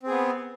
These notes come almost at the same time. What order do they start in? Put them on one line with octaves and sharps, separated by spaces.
C4 G#4 B3